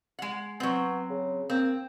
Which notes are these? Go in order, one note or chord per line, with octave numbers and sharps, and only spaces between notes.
G#3 F#5
F#3 B3 C4
C#3
A#3 C4